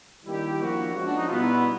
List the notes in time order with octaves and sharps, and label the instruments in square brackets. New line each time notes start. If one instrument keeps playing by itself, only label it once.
[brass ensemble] D#3 G3 A#3 D4 G4 [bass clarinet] E4
[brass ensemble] F3 A#3 D4 F#4
F3 G#3 C#4 F#4
[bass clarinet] D4
D#4
[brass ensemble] B2 G3 B3 [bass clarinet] F4
[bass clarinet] E4
E4